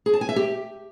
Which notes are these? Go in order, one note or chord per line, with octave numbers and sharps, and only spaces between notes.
G#4
A5
G#5
E5
G4